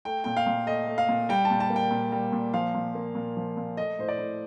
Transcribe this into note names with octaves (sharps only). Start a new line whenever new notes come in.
A3 G5
A#2 G5
F5
A#2
A3 D#5
A3
F5
A#2
G3 G5
A5
A#2
A5
A#3
G5
A#2
G3
A#2
F3 F5
A#2
A#3
A#2
F3
A#2
A3 D#5
A2 C5
D5
A2